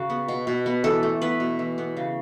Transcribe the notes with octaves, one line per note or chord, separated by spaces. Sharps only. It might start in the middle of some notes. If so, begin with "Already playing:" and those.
Already playing: C#3 F#4
B3
B2
B2
B3
E3 A4
A3
B3 B4
B2
E3
B3
C#3